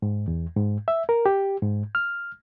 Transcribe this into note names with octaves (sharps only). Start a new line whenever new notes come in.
G#2
E2
G#2
E5
A#4
G4
G#2
F6